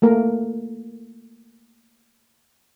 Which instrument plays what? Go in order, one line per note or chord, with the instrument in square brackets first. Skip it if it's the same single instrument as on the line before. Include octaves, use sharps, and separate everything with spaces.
[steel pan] A3 A#3 A#4